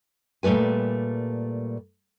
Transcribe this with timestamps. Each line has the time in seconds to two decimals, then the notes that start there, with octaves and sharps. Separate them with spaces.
0.43 A#2 G3 A3 B4 G#5